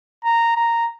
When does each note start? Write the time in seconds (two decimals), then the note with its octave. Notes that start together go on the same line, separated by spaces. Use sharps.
0.24 A#5
0.57 A#5